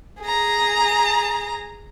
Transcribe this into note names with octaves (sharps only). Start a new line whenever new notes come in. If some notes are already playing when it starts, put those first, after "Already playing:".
G#4 A#5